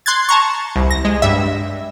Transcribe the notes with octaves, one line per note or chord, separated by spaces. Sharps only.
C6 F#6 G#6 A6
A5 A#5 C#6
C2
A#6
G#3
G2 E5